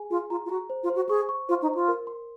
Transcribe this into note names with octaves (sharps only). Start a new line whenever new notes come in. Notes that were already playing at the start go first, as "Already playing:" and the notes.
Already playing: G#4 G#5
F4 G#4
F4 A#5
F4
F#4 A#5
C5
F4
C5
F#4
G#4 C#6
C#6
F4 C5
D#4
C5
F4
A#4
C6